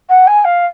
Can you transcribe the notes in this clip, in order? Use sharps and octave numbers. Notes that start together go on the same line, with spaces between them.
F#5
G#5
F5